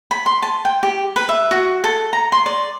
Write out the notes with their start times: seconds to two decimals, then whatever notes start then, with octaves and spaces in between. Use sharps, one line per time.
0.11 B5
0.26 C6
0.42 A5
0.65 G5
0.83 G4
1.16 B4
1.29 E5
1.51 F#4
1.84 A4
2.13 A#5
2.32 C6
2.46 D5